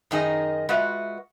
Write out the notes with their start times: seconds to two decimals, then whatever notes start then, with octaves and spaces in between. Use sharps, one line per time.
0.11 F#2 D#3 D#4 G#4 D#5
0.69 G#3 F4 F#4 B4 E5